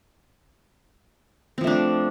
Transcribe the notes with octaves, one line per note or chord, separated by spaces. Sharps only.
F3 A3 C4 D4